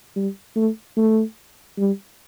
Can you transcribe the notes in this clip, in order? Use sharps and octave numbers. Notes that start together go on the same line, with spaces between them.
G3
A3
A3
G3